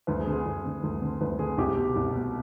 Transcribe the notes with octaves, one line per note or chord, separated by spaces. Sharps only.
D2 B4
G#4
D3
G#4
D2
D3
D2
D3
D2 B4
D3 G#4
C2 G4
B2
C2
B2